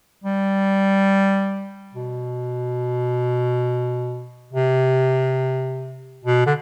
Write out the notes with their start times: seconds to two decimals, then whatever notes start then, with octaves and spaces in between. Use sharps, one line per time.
0.24 G3
1.94 B2
4.53 C3
6.25 B2
6.46 D3